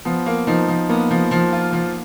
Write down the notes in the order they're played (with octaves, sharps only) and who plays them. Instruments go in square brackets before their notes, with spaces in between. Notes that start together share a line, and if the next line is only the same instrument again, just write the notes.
[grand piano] F3 [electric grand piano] B3
[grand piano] A#3
[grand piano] F3 [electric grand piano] D#4
[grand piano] F3
[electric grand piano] A#3 [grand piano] B3
[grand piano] F3
F3
F4
F3